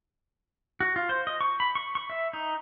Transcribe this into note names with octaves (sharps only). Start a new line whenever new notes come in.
F#4
F4
C5
D#5
C#6
B5
C#6
C#6
E5
D#4